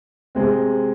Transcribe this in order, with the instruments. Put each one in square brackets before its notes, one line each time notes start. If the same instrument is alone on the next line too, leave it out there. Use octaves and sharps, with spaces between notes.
[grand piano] C3 G#3 C4